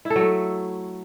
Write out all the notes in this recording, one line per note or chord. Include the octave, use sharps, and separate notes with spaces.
E4
A4
F#3
A3